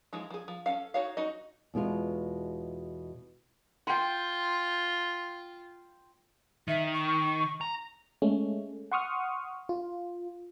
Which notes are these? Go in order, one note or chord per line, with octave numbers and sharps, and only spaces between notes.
E3 F3 G#3 D#4
F3 G#4
F3
C#4 A4 F5
D#4 F#4 C#5 F5
D#4 F#4 D#5
E2 B2 G#3 F4
F4 G5 C6
D#3 E5
C#6
A#5
G#3 A3 C#4
F#5 C6 C#6 D#6 F6
F4